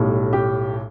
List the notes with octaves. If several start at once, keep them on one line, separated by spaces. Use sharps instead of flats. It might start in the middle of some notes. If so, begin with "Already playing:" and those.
Already playing: B1 A2 G3
G4